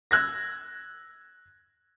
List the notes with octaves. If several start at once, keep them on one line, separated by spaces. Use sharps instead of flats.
E6 F#6 G#6 A#6